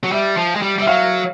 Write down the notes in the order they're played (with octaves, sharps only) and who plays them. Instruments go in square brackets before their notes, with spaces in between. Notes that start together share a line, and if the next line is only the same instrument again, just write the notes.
[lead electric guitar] F#3
[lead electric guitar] G3 [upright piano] E5
[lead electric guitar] F3
G#3
G3
[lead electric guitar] G3 [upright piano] E5
[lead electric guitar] F#3 [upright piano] F5